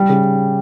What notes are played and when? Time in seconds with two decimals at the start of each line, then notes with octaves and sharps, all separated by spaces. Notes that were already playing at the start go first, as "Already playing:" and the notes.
Already playing: G3
0.09 C#3